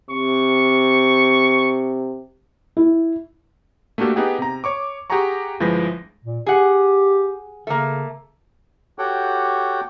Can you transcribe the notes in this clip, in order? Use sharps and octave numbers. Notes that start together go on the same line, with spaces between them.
C3 C#6
E4
A3 A#3 D4 F#4 G4 A4
B3 D#4 G4 G#4 F#5 G5
C3 A#5
C#5 C#6 D6
G4 G#4 F#5 G#5 A#5 C#6
G1 F3 G#3 E4 B4 A#6
A#2
G4 G#4 F#5
C#3 A3 A#3
F#4 G4 A4 C#5 F#5 G5